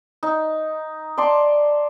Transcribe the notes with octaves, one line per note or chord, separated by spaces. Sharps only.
D#4
D5 A5 C6 D6